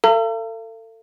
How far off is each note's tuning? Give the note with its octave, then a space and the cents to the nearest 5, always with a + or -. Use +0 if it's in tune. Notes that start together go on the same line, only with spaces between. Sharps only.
A4 +35 F5 -45 A#5 -45